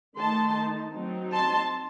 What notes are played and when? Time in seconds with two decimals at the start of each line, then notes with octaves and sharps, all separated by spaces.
0.17 D#3 A3 D#4 A5 C6
0.94 F#3 C4 D#4
1.33 A5 C6